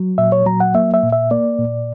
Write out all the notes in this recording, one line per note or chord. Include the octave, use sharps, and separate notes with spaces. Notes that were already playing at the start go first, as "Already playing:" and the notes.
Already playing: F#3
A#2 E5
C#5
F#3 A#5
F#5
A#3 E5
E5
A#2
E5
A#3 D5
A#2